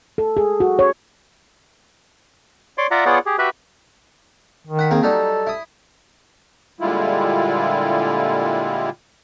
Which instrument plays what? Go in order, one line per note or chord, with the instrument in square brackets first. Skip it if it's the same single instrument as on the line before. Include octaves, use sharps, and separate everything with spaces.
[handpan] A4
G#4
F#4
C#5
[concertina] C#5 D5 C6 D6
F4 D5 E5 F#5 A#5
B3 F4 G#4 C#5 D5 F#5
G4 G#4
F#4 G4 B4 E5 B5
[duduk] D#3
[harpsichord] F#5 B5
A#3 C4 G#4
[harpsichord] F#3 G3 D#4 [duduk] A4
[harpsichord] E4 D#6
[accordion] A#2 D3 G3 G#3 E4 F4